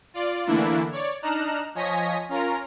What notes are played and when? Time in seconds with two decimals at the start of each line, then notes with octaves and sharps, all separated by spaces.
0.14 F4 D5
0.46 D3 E3 A3 A#3 D4 E4
0.92 C#5 D5
1.22 D4 D#4 A#5 F6 F#6 E7
1.75 F3 C#5 D#5 G#5 A#6 B6
2.29 C#4 F4 A#4 A#5